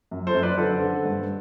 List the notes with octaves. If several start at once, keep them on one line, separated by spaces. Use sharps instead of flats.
F#2
A4 C5
F#2
B4 D5
D3 A4 C5
D3
G2